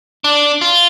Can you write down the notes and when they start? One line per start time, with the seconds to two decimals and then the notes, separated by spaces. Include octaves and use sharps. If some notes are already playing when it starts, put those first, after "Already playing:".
0.24 D4
0.61 F4